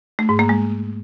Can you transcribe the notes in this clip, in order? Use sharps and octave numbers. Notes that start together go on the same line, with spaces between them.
A3
G#2
A#3
G#3